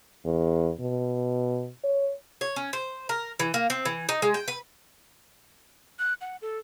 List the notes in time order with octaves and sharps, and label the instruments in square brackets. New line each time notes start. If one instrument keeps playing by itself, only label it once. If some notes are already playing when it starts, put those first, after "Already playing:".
[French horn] E2
B2
C#5
[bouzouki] C#5
C#4
C5
A#4
E3
A#3
C4
E3
D#4
G#3
G5
B4
[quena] F#6
F#5
A4